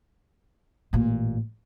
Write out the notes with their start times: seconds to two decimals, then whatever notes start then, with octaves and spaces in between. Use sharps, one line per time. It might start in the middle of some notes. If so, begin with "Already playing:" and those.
0.93 A1 A#2